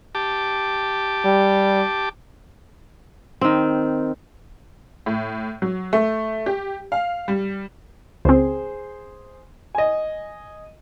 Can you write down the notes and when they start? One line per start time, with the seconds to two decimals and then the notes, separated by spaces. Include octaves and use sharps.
0.15 G4 A5 D6
1.24 G3
3.41 D#3 C4
5.06 A2
5.62 F#3
5.93 A3
6.46 G4
6.92 F5
7.28 G3
8.25 C#2 C4 G#4 C5
9.75 D#5 G#5